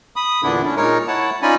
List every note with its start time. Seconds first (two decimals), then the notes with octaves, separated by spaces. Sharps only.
0.16 B5 D#6
0.43 E2 A#2 D3 B3 D4 E4
0.65 C#4 D4 E4
0.76 A#2 G#3 D#4 A#4 C#5
1.08 E4 C#5 F#5 A5
1.42 C#4 D#4 F4 D5 G#5 B5